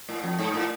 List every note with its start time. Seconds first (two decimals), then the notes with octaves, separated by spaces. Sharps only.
0.09 A2
0.24 F2
0.39 G#2
0.54 A2